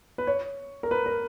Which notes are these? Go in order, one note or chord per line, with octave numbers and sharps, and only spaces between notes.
B4
C#5
A#4
B4
A#4